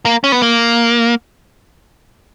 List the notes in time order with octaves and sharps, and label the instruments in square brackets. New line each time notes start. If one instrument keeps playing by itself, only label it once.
[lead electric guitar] A#3
C#4
B3
A#3